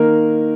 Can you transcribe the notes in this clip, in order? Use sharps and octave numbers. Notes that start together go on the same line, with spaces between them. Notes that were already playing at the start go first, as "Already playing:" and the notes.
Already playing: D#3 A#3 A#4